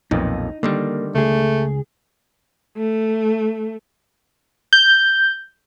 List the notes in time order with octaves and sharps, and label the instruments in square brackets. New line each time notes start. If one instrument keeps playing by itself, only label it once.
[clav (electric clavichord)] B1 F2 A#2 [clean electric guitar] D#4
[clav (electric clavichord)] D3 D#3 G3 [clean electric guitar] A#3
[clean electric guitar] C#2 G#4 [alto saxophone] A3
[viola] A3
[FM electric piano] G6